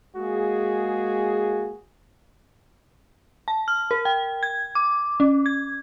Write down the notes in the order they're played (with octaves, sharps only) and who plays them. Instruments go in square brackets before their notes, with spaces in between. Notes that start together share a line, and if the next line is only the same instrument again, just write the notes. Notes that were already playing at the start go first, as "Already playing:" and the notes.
[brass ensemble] G#3 A#3 F#4 G#4
[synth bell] A5
F6
A#4
G5
G#6
D6
C#4
G#6